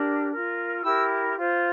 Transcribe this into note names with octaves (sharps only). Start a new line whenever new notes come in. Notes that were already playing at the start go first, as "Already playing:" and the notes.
Already playing: D4 G4 A#4
F4 A#4
E4 G4 A#4 E6
F4 C5